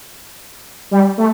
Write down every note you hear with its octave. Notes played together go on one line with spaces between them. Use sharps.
G3
A3